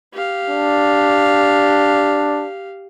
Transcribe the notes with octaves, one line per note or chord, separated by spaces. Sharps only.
G4 F5
D4